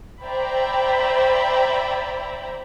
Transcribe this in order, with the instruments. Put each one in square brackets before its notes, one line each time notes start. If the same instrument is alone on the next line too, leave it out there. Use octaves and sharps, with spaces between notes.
[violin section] C5 D5 E5 G5 A#5 B5